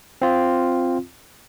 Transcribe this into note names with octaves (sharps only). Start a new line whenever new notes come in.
C4 F4